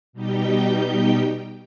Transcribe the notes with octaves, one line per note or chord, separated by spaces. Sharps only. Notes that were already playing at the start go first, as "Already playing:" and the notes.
B2 G3 D#4 G4 G5 G6